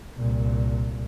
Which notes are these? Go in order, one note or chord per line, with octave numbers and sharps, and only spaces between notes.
C2 A#2